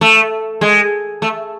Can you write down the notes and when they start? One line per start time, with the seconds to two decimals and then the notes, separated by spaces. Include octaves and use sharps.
0.01 A3
0.61 G#3
1.22 A3